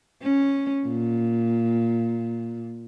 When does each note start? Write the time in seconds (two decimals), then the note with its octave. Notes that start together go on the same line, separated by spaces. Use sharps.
0.22 C#4
0.87 A#2